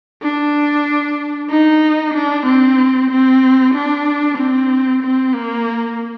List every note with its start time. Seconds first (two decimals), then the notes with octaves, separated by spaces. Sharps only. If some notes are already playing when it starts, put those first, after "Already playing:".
0.22 D4
1.50 D#4
2.14 D4
2.46 C4
3.10 C4
3.74 D4
4.38 C4
5.03 C4
5.34 A#3